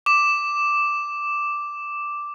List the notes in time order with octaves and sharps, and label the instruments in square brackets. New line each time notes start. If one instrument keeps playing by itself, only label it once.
[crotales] D6 E7